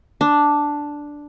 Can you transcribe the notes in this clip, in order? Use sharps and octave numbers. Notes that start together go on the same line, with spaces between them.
D4